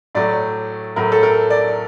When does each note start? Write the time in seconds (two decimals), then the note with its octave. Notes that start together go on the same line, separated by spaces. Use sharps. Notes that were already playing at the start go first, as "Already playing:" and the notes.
0.15 A2 F#3 A3 D5
0.96 A2 F#3 A3 A#4
1.12 A4
1.23 A#4
1.50 D5